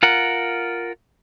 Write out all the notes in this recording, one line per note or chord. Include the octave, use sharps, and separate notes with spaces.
F4 A#4 F#5